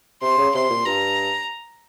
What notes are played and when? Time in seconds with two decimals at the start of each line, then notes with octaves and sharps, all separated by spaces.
0.22 C3 C6
0.38 C#3
0.54 C3 C6
0.70 A#2
0.86 G2 A#5